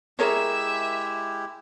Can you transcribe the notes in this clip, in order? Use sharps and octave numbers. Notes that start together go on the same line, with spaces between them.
G#3 E4 G4 G#4 A#4 C#5 E5